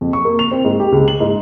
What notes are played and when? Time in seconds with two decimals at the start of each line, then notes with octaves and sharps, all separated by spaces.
0.01 F2
0.13 C#6
0.25 A#3
0.39 F7
0.51 C4
0.65 G#2
0.79 G4
0.92 C#2
1.08 F#7
1.20 G#2